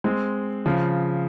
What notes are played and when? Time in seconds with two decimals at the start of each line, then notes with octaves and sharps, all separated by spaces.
0.04 G#3 C4
0.66 C#3 F3